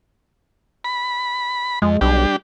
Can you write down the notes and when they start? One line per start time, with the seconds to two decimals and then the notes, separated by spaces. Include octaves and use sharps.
0.84 B5
1.82 F2 G#3
2.01 B1 G3 D4 G4